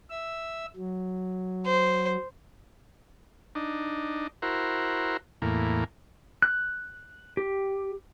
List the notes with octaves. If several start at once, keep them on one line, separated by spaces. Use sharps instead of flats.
E5 E6
F#3
C5
D4 D#4
E4 F#4 A#4 C5
E2 A2 A#3
F#6
G4